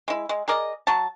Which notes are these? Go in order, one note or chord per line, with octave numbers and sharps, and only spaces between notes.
G#3 E4
G#3
G#4 A#4 D5 D#5
F#3 A5